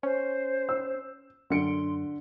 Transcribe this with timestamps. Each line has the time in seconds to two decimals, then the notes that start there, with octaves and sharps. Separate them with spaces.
0.03 C#4 C5
0.69 E6
1.50 F#2 D3 C6 C#7 D7